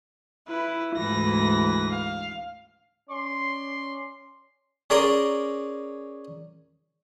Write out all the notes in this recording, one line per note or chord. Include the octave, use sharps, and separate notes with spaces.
E4 B4
D2 G#2 E3 B4 A#6
F5
C#4 D5 C6
C#4 G#4 A#4 D5 C6